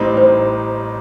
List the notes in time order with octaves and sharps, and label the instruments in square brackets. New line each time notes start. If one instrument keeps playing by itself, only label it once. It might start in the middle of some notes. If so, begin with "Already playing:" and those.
Already playing: [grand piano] A1 A2 G3 C4 D#4
[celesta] C5